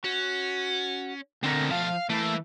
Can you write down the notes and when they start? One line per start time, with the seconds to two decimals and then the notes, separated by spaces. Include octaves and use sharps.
0.04 C#4 F#4
1.43 D2 B2 A3 C4 A#4
1.71 F3 F5 A5
2.10 E3 A3 A#3